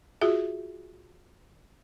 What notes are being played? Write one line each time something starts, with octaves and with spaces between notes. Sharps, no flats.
F4 F#4 G#4 E5